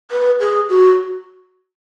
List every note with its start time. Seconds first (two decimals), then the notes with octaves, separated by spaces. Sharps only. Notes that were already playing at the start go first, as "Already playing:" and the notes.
0.11 B4
0.40 G#4
0.70 F#4